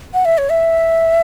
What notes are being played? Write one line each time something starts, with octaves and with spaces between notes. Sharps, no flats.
F#5
E5
C#5
E5